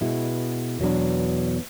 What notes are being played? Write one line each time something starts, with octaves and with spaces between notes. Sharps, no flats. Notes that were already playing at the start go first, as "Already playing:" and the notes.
B2 G#3 B3 E4
E2 B2 F#3 B3 D4